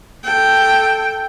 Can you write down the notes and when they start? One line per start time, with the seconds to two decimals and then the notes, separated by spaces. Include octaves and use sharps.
0.24 A4 G5